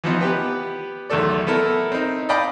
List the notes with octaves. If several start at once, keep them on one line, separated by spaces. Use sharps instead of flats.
E3 F3 B3 D#4
B3 G4 B4
B1 E2 D#3 A3 A4 D5
B3 E4 A4 A#4
C4 D#4
D5 D#5 F5 G5 B5 D6